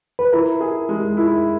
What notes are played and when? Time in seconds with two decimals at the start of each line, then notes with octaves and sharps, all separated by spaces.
0.19 B4
0.32 E4 A#4
0.60 G#4
0.89 G#3
1.17 E4